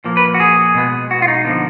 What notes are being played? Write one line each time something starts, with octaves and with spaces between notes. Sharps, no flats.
A#2 F3 A#3
B4
F#4
G#4
B2 G#3 B3
F#4
F4
D#4
D3 F3 A#3